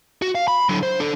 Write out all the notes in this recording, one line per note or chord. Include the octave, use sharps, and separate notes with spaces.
F#4
F5
B5
D3 F#3
C5
D4 A4